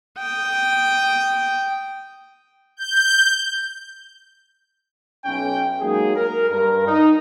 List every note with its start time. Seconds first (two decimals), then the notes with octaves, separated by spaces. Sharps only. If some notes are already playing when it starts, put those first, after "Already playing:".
0.18 G5 D#6
2.77 G6
5.25 B1 C#4 G5
5.81 F#3 G#3 A#3 D#4 G#4
6.16 A#4
6.49 G2 A#4
6.87 D#4